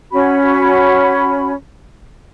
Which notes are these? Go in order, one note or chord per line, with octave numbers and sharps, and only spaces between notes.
C#4 F#4 B5